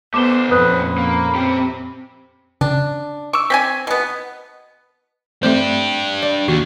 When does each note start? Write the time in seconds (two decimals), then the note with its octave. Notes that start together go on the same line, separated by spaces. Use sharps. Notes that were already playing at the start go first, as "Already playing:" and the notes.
0.14 A3 B3 C5 D6 E7 G7
0.51 F2 A#2 C#4 B4 B5 D#6 F#6
0.98 A#3
1.35 C4 G4
2.61 C#3 D4
3.33 C#6 D6 E6
3.50 C4 G5 G#5 B6
3.87 B2 B3
5.43 A3 C4 D4 G4 C5
6.23 D5
6.48 D#2 F#4